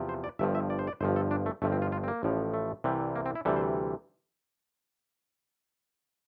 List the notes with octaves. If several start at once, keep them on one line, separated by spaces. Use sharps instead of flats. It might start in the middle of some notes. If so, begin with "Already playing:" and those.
Already playing: E2 C3 F3
C5
D5
G1 G2 F3 E5
E5
D5
C5
D5
G1 G2 F3 C5
A4
D4
A3
G1 G2 F3 A3
C4
F4
F4
C4
A#3
A1 A2 F3
A3
C2 C3 E3 G3
A#3
C4
E4
D2 C3 E3 G3 A4
C5